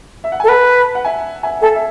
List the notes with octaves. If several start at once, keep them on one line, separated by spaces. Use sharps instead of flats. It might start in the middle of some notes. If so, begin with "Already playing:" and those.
E5
F#5
G#5
A4
B4 F#5 A5
F#5
E5 G#5
E5 G#5
A4 E5 G#5
E5